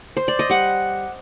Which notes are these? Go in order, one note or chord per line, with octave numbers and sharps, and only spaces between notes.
C5
D5
D#5
G3 F#5